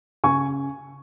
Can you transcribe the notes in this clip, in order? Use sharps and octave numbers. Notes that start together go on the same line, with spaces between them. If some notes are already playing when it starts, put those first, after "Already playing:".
C#3 G#5 C#6